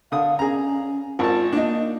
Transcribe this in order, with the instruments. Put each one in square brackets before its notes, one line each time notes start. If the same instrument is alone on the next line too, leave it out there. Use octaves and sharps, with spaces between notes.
[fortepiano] D3 D#6 [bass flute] F5
[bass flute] C#4 [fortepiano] G#4 A#5
[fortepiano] G#1 A5 [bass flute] F4
[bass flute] A#3 [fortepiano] D4 D#4